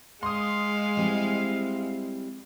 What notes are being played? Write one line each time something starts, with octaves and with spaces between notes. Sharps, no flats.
G#3 F5 C6 D#6
G3 C4 E4